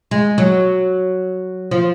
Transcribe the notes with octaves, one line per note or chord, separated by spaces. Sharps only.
G#3
F#3
F3